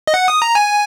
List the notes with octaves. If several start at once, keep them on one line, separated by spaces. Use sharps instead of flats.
D#5
F#5
D#6
A#5
G#5